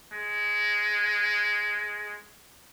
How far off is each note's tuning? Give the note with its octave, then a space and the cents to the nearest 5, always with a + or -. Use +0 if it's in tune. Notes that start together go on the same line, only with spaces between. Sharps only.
G#3 +5